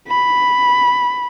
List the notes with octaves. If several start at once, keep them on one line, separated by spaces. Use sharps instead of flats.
B5